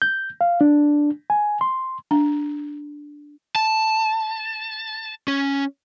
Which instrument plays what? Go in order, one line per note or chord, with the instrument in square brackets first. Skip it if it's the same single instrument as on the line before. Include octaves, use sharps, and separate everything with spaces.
[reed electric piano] G6
F5
D4
G#5
C6
[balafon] D4
[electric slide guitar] A5
C#4